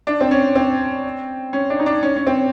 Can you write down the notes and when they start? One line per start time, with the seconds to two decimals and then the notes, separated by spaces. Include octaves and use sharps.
0.07 D4
0.21 C4
0.31 C#4
0.55 C4
1.53 C#4
1.70 D4
1.79 D#4
1.86 D4
2.03 C#4
2.16 C#4
2.27 C4